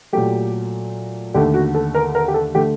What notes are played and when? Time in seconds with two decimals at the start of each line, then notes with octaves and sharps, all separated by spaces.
0.13 A#2 F#3 A3 G4
1.34 D#2 D3 A3 G4
1.54 F#4
1.75 A4
1.95 A#4
2.15 A#4
2.28 G4
2.34 A4
2.55 D3 A3 G4